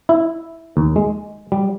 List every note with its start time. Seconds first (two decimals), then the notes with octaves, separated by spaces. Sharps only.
0.09 E4
0.77 D#2
0.96 G#3
1.52 G3